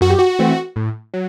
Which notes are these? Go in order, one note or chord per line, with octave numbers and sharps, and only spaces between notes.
F#2 F#4
G4
F#4
E3 A3 C4
A2
F#3